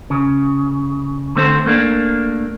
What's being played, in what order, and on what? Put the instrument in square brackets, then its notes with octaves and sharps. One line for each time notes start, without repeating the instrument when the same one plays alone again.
[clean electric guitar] C#3
D3 A3 C4 C5
A3 A#3 D4